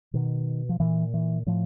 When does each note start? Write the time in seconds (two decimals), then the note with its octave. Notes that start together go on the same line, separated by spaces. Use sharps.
0.14 B2 D#3
0.69 F3
0.80 A#2 E3
1.14 E3
1.47 A2 F3